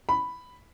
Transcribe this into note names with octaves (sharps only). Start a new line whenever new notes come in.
B5